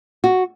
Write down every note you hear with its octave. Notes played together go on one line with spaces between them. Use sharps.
F#4